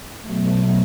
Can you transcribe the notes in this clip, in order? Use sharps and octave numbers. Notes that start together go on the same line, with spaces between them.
B2 F#3 A3